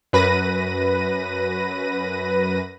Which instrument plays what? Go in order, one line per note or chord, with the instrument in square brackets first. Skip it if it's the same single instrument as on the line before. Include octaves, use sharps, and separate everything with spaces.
[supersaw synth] F#2 B4 A#6 D#7